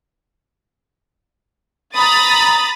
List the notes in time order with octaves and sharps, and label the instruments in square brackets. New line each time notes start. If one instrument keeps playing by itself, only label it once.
[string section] A#5 B5 D#6 A6